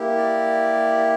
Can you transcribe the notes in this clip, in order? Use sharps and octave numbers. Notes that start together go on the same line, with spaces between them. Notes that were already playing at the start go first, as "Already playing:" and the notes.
Already playing: A#3 E4 G4
D5